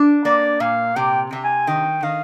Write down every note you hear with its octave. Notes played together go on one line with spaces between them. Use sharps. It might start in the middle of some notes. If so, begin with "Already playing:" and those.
Already playing: D4
A#3 D5
A#2 F5
C3 G5
C3
G#5
D#3 G5
D#3 F5